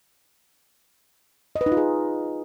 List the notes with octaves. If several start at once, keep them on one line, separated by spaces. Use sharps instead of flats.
D#5
B4
D#4
F4
G#4